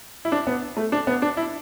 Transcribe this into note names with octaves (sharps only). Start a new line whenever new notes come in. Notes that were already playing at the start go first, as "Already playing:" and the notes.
E4
D4
B3
A3
D4
B3
D4
E4